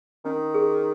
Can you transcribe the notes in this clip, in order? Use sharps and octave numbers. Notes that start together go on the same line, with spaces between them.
D#3 C#4
G#4